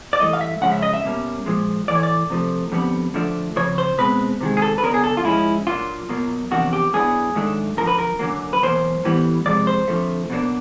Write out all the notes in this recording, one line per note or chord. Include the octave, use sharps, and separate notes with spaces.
D5
G2 E3 A3 D#5
F5
E5
C#3 F3 G#3 C#4 F#5
E5
D#5
E5
B2 G3 A#3 C#4
A#2 F3 G#3
A2 E3 A3 D5
C#5
D5
C3 F3 A3
F2 D3 G3 B3
D3 F3 A3 D4
F2 C#3 F3 C#5
C5
B2 G#3 C4 B4
C3 D#3 G#3
G#4
A4
B4
C#3 F#3 B3 D4 A#4
G#4
A4
F4
G#2 F3 G#3 C#4 E4
A#2 F#3 A#3 D4 F4
B2 F#3 A#3
E2 C3 F3 A#3 D4 F#4
G4
A2 F#3 B3 D4 G#4
G#2 D#3 F#3 A3 D4
F#2 D3 F3 A#4
B4
A#4
F#2 D3 F#3 A#3
B4
E2 B2 F#3 A#3 C5
A2 E3 G3 B3
F2 C3 F3 G#3 D5
C5
F2 D3 F3 A3
B2 F#3 A#3 D4